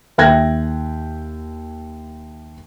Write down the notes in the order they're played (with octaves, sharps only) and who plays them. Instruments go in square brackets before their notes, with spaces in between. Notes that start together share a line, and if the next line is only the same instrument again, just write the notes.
[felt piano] D#2 E5 G5 F#6 G#6 A#6